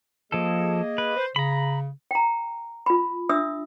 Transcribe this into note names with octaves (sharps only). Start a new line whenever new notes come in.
F3 A#3 G#4 A4 D#5
B4
C5
C#3 A#5 B5
G5 A#5
F4 B5
D4 E5 D#6 E6